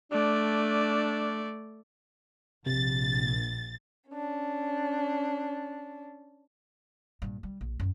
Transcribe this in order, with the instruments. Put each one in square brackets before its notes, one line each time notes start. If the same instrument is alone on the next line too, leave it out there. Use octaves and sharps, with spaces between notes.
[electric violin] A3 D5 [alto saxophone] D4
[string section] A#1 A6 [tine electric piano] C3
[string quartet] C#4 D4
[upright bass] G2 A#2
G3
A#1
D#1 F#2